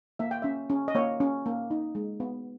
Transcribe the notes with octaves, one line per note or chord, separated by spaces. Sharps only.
A#3 E5
G5
C#4 E5
C#4
D#5
A#3 C#5
C#4
A#3
D#4
G#3
B3